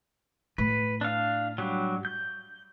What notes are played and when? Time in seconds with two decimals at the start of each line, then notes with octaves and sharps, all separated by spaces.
0.58 A2 B4
1.01 D4 F5
1.58 F#3 G3 D4
2.05 G6